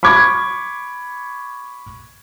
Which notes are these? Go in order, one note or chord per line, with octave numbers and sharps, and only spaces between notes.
B5 C#6 D6 G#6